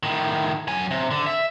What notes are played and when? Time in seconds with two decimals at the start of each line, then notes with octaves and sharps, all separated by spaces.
0.03 A2 D#3
0.68 F#3 G#5
0.91 C3
1.11 D3
1.26 E5